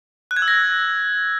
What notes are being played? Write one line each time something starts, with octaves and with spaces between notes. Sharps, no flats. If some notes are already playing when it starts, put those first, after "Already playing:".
F#6
G#6
E6
A#6